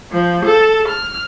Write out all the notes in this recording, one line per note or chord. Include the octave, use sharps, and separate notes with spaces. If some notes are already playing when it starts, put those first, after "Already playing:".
F3
A4
F6